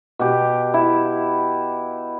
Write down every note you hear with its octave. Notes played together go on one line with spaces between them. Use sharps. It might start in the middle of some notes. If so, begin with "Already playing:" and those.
B2 G4
E4